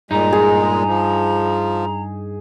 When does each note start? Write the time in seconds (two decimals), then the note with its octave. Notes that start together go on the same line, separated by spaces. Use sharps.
0.11 G2 A#2 G#3 D#4 A#5
0.33 G#4
0.87 F3